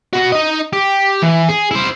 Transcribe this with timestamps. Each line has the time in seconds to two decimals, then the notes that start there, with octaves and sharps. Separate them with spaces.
0.13 B3 F#4
0.32 D#4 D#5
0.73 G4
1.22 E3
1.49 G#4
1.71 E4 C5